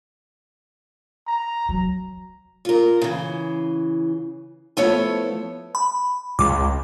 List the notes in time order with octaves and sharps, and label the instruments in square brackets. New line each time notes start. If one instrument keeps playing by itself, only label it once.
[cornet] A#5
[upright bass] F#3
[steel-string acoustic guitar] F4 A#4
C#3 E3
F3 A3 B3 E4 A4 C#5
[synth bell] B5
[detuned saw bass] C#2 [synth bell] D6